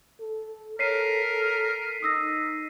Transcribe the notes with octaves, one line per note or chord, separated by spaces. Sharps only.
A4
A4 A#4 C#5 B6 C7 D#7
D#4 D#6 E6 A#6